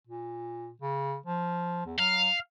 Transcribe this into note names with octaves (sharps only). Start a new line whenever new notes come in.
A#2
C#3
F3
E2
F#3 F5